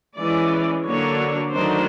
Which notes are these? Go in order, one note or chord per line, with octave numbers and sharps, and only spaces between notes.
E3 G#3 C#4 D5
D3 F#3 A#3 D4 C#5
D#3 F#3 A3 D4 C5